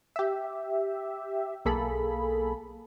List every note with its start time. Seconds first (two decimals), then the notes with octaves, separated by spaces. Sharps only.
0.16 G4 E5
1.65 B1 A#3 G#4 A4 B5